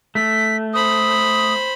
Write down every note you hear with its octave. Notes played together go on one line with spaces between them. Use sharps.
A3 B6
C5 B5 D#6